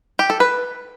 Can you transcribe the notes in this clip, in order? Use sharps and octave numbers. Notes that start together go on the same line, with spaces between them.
G4
A4
B4